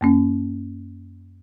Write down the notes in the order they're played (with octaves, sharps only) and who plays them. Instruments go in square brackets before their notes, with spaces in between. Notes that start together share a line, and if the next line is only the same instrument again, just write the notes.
[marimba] F#2 A#3 C#4